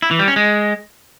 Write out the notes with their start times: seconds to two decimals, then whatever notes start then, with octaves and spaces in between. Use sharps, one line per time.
0.02 E4
0.11 E3
0.19 G3
0.28 C#4
0.36 G#3